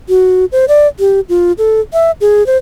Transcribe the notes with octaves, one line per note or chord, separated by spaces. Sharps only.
F#4
C5
D5
G4
F4
A4
E5
G#4
C5